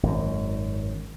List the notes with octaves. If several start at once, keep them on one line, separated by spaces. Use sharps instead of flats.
G#1 F#2